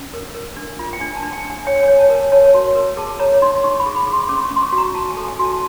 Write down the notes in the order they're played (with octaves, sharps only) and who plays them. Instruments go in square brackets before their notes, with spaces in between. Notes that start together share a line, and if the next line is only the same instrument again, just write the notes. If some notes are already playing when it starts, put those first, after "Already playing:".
Already playing: [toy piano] C#4
A#4
A#4
D4
F4
G5
D4 G#5
A5
D4
G5
D4
G#5
C#5 G5
C#5 G#5
A5
A#4
G#5
C#5 A5
F#4
A#4
G#4 A5
C#5 A#5
D#4 C6
D#4 C#6
B5
G#4
B5
G#4
C6
C#4 D6
C#6
C#4
C6
C#6
F#4
A#5
F#4 A5
G#5
A4
G#5
F#4
A5